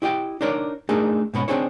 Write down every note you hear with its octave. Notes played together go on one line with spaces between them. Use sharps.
E4 G4 D#5 G5
D4 D#4 A#4 C#5 D5
A3 D4 D#4 G#4 A#4
G#2 B2 B3 C#4
C4 D4 D#4 G#4 C5 C#5